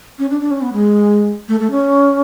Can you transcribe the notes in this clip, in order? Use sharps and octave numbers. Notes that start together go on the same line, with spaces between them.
C#4
D4
D4
C#4
B3
G#3
A3
A3
C#4